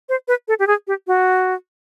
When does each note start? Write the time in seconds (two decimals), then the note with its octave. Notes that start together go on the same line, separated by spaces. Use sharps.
0.09 C5
0.28 B4
0.48 A4
0.59 G4
0.67 G#4
0.87 G4
1.07 F#4